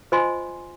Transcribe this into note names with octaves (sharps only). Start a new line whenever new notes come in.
F4 C5 D#5 G#5 C6